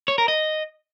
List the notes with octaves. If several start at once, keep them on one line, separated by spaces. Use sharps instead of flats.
C#5
A#4
D#5